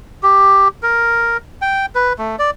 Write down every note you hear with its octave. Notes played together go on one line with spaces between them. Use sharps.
G4
A#4
G5
B4
A3
D5